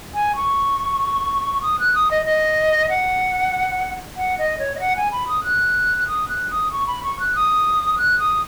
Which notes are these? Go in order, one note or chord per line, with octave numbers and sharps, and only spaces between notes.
G#5
C#6
D#6
F#6
D#6
D#5
D#5
F#5
F#5
D#5
C#5
D#5
F#5
G#5
B5
D#6
F#6
D#6
F#6
D#6
C#6
B5
C#6
F#6
D#6
F#6
D#6